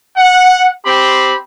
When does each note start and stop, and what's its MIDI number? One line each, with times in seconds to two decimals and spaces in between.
0.16 0.68 78
0.84 1.34 60
0.84 1.34 67
0.84 1.34 83
0.84 1.34 84